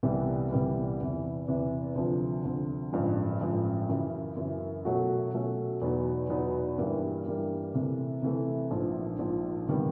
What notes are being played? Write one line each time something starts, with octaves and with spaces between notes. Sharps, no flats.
C2 C3 E3 G3 B3
C2 C3 E3 G3 B3
E2 C3 E3
E2 C3 E3
D2 C3 F3
D2 C3 F3
A1 G2 D3 F3 G#3
A1 G2 D3 F3 G#3
F#2 C#3 E3
F#2 C#3 E3
B2 F#3 A3 C#4 F#4
B2 F#3 A3 C#4 F#4
E2 B2 F#3 B3 D#4
E2 B2 F#3 B3 D#4
G2 E3 G3 A#3
G2 E3 G3 A#3
C3 E3 A3
C3 E3 A3
A#1 G#2 F3
A#1 G#2 F3
C3 D#3 G3 B3